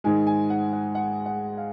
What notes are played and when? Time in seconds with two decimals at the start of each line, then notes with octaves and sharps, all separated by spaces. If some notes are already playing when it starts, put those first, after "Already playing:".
0.04 G#2 D#3 G#3 G#5
0.27 G#5
0.50 F#5
0.73 F#5
0.95 F#5
1.26 F#5
1.57 F5